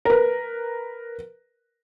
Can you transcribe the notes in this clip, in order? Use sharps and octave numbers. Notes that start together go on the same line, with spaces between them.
A#4 B4